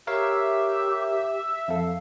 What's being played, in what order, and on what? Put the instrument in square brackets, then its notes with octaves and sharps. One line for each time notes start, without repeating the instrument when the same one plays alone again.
[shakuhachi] G4 [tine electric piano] A#4 C#5 F5 [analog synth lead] E5
[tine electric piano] F2 A4 [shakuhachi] F5